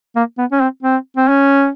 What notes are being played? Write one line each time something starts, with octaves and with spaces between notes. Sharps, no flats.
A#3
B3
C#4
C4
C4
C4
C#4